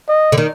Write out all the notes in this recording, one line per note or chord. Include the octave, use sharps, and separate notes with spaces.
D#5
D3
D#3